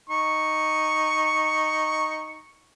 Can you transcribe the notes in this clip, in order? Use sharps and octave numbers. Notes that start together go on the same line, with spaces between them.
D#4 C#6